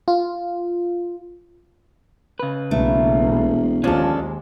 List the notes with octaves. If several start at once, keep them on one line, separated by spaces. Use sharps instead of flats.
F4
C#3 B4
E1 B1 A3 A#3
D#2 F3 G#3 C#4 D4 F4 A4